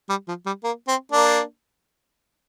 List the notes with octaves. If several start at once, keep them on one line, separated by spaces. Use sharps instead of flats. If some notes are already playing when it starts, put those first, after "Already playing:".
G3
F3
G3
A#3
C4
A#3 D4